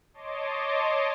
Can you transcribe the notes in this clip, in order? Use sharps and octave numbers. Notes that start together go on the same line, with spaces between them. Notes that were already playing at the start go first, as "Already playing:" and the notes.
C#5 D#5 A5 C6 D6